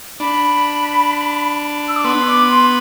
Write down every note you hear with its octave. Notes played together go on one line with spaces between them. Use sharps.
D4 B5
E6
D6
B3 C6
C6
D6
C6